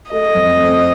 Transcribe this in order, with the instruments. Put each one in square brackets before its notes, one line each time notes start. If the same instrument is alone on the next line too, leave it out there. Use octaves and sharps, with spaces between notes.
[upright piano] A3 [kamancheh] D#5
[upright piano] F2
C4